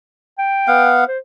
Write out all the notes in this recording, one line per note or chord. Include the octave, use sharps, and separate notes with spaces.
G5
B3 F5 F#5
C5